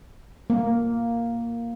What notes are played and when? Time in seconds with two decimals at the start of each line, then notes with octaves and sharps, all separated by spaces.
0.50 A#3